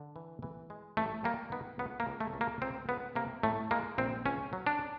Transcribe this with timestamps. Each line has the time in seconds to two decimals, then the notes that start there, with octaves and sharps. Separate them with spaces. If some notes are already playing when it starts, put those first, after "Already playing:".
Already playing: D3
0.16 E3
0.43 E3
0.70 G#3
0.97 A1 A3
1.24 G3 A#3
1.52 D#3 B3
1.79 C#2 B3
2.00 A#3
2.07 C#2
2.20 A3
2.34 C#2
2.41 A#3
2.62 C#2 C4
2.89 C#2 B3
3.15 C3 A#3
3.43 A2 A3
3.71 G#3 A#3
3.98 A#1 C4
4.25 C#2 C#4
4.53 F#3
4.67 D4